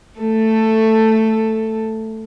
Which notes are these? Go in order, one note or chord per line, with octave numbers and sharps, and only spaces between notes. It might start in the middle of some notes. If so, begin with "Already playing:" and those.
A3 A4